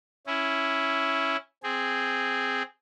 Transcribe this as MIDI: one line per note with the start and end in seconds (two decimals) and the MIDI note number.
0.27 1.37 61
0.27 1.37 64
1.63 2.62 60
1.63 2.62 68